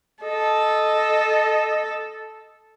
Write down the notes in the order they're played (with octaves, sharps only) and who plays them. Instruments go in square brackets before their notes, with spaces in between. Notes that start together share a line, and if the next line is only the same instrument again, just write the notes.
[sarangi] A4 [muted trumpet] D#5